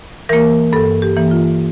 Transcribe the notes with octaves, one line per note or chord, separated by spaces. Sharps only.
E3 A#3 A#4
G2 A4
G4
E3 A#3
F4